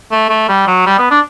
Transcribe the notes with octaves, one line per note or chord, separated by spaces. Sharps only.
A3
A3
G3
F#3
G3
B3
D4